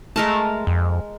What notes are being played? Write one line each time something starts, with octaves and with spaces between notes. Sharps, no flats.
G#3 A3 A#4 A5
F2